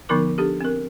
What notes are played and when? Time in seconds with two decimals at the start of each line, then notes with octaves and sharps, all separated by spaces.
0.09 D3 F3 B3 D#4 A#4 D6
0.38 D4 G4 A4
0.61 C4 A#4